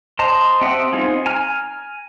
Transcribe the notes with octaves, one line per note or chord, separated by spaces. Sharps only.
C5 D#5 A5 A#5
C4 G4 E5 F#5 D#6
B3 C4 D#4 F4 G#4
G#5 A#5 F6